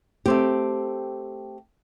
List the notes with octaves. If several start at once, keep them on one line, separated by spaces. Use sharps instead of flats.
A3 C4 G4